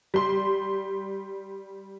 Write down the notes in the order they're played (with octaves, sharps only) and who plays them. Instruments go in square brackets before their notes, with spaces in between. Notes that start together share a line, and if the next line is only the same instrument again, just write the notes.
[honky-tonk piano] G3 C6